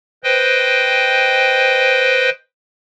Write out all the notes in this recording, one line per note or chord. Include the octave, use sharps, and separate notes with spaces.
B4 C5 D#5 G5